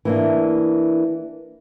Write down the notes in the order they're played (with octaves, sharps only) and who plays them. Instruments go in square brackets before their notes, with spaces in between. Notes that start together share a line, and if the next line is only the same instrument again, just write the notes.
[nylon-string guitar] E3 A#3 D4